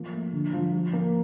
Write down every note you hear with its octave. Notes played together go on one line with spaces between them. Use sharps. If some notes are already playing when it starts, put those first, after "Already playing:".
Already playing: F3 A#3
A3
D3
F3
F3
A#3